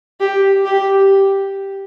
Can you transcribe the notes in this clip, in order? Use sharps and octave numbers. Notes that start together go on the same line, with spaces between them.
G4
G4